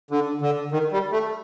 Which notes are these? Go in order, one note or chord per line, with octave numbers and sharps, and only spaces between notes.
D3
D3
D#3
G3
A3